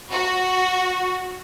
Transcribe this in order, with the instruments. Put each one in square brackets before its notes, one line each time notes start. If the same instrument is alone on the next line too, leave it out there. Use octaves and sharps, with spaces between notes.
[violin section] F#4